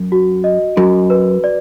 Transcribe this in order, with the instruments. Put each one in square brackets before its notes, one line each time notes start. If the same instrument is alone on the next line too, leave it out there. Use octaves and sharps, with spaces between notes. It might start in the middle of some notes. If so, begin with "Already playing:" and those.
Already playing: [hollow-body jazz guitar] F#2
[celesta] F#4
D#5
[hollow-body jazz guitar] F#2 [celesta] F#4
[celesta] B4
D5